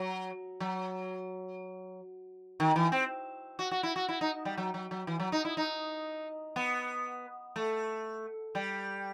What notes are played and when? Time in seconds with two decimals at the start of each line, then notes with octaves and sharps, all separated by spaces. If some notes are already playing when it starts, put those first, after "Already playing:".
Already playing: F#3
0.60 F#3
2.60 D#3
2.76 E3
2.92 C4
3.59 F#4
3.71 F#4
3.83 E4
3.96 F#4
4.09 E4
4.21 D#4
4.45 G3
4.58 F#3
4.74 F#3
4.91 F#3
5.07 E3
5.20 F#3
5.32 D#4
5.45 E4
5.57 D#4
6.56 B3
7.56 A3
8.55 G3